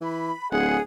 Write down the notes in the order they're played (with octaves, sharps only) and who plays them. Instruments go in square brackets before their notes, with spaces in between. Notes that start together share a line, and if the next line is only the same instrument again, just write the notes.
[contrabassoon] E3 [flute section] B5
[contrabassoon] D1 [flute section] G#4 [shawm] F#5